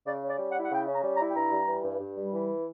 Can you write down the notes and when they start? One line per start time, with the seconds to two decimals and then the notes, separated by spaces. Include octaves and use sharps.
0.06 C#3 D5
0.23 C#4
0.28 D5
0.39 G3
0.50 F#5
0.55 E4
0.62 F#5
0.71 C#3 G5
0.87 C#4
0.93 A#5
1.04 G3
1.14 A#5
1.19 E4
1.31 G5
1.35 G2 A#5
1.52 G3
1.68 E3
1.84 G2
2.00 G2
2.16 G3
2.32 E3